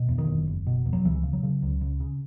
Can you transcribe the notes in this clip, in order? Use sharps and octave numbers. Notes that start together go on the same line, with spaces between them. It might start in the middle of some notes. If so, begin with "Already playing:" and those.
Already playing: B2
E2
D#3
F#1
F#1
B2
E2
F#3
C#2 E3
C#3
F#3
C#3
C#2
C#2
C#3